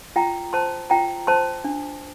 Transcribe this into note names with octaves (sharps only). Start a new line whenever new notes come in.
F4 G5 A#5
C5 A5 C6
F4 G5 A#5
C5 A5 C6
D4